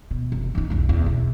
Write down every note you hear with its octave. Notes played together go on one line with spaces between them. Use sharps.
B2
F1
E3 D#4
B1 E2
E2
B2